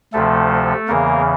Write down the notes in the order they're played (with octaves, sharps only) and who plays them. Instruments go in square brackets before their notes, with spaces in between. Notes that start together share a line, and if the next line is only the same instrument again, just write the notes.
[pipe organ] D2 C3 F3 A3 A4
E2 C#3 E3 A#3 A#4